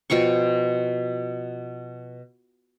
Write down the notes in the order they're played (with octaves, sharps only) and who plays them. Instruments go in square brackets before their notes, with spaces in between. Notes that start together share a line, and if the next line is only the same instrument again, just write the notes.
[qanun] B2 F3 G5 C#6